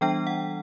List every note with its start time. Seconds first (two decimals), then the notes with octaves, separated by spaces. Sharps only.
0.01 E3 G3 B3 D4 G5
0.27 F#5